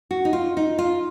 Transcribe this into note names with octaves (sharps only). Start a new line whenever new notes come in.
F#4
D#4
F4
D#4
F4